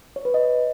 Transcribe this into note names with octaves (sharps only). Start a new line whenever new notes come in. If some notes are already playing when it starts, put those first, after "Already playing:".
C#5
B4
D#5